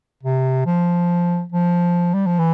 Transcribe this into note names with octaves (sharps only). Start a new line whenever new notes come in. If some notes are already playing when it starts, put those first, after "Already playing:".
C3
F3
F3
G3
F3
E3